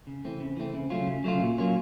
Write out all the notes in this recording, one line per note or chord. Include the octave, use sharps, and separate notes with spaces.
C#3
E3 A3 C4
C#3
E3 A3 C4
C#3
F#3 A3 C#4 F4
C#3
F#3 A3 C#4 F4
A#2
F#3 A#3 C#4 F4